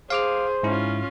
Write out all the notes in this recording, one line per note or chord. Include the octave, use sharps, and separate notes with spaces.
G#4 C5 F5 D6 F6
G#2 C#4 E4 F4